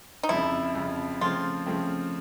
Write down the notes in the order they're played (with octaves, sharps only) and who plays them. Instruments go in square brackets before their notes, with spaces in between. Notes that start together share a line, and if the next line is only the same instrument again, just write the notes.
[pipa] D#4
[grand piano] F2 C#3 F3 [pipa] E4
[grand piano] F2 C#3 F3
[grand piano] C#3 F3 A3 C4 [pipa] F4
[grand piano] C#3 F3 A3 C4